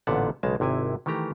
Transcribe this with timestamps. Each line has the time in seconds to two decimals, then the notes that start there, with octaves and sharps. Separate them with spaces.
0.07 A1 A#2 D3 B3 F#5 A5
0.43 B1 C#3 G#3 A5
0.60 G#1 C3 E4 G#5
1.06 D#3 E3 A3 G4 A#5